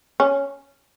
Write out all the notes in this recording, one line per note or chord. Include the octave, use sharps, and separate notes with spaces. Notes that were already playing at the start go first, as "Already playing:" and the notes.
C#4